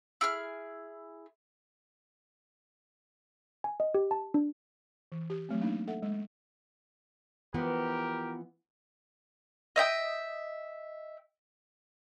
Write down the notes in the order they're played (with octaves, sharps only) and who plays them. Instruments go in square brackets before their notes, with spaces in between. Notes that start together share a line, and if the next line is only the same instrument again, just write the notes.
[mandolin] E4 G#4 F6
[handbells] G#5
D#5
G4
A5
D4
[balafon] E3
G4
F#3 A3 C4
A#3 D4 D#4
A4 E5 F#5
G#3
[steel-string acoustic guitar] E3 F3 B3 [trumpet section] G4 A#4
[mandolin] D#5 E5 G5 D#6